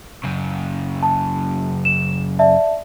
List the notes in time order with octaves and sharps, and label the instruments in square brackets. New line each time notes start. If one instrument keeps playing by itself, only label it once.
[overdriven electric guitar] F#2 C#3
[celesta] A5
E7
D5 E5 A5